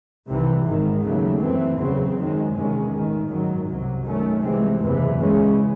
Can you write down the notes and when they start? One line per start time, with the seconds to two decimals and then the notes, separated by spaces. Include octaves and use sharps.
0.27 C2 C3 E3
0.64 G#1 G#2 D#3
1.02 D#2 C#3 F#3 A3
1.41 F#2 E3 A3 C4
1.77 E2 C#3 F#3 C4
2.16 F#2 D#3 G#3
2.53 E2 C3 D#3 G#3 C#4
2.91 A1 G#2 D#3
3.29 G#1 F#2 D#3 F#3
3.67 C2 C3 F#3
4.05 F#2 D#3 A3 C#4
4.42 C2 C3 E3 G#3 C4
4.81 F#1 E2 C3 E3 G#3
5.18 C#2 C#3 E3 G#3 C#4